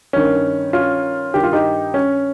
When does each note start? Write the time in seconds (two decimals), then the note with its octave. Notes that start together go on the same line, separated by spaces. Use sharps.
0.13 G2 D#3 C#4
0.73 C#4 F4
1.34 G2 D#3 G4
1.43 F4
1.53 D#4 G4
1.94 C#4